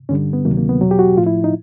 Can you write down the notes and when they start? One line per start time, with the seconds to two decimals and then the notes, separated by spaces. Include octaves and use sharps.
0.09 G2 D3 G3 C#4
0.33 B3
0.45 D2 C3 D#3 F#3 A#3
0.57 A#3
0.69 B3
0.81 E2 B2 F#3
0.91 G4
0.99 F#4
1.17 A2 F3 F4
1.26 E4
1.44 D#4